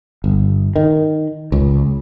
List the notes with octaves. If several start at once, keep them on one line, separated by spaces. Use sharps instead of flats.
G1
D#3
C#2